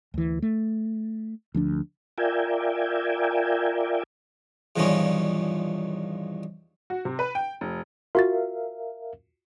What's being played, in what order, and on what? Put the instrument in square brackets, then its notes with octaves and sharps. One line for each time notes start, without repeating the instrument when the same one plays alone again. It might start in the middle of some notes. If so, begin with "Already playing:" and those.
[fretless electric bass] D2 E3
A3
D2 F3 D4
[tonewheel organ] F4 A#4 D5 E5 G5 G#5
[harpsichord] E2 G2 A#2 D#3 F3 C#4
[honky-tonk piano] F#4
C3
B4
G5
F1
[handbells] F4 F#4 A6 [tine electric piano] A#4 E5 F5